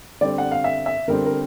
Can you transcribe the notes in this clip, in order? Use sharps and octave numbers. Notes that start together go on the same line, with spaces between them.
D3 G3 C4 D5
F#5
F5
E5
E5
D3 G3 C4 A#4
A#4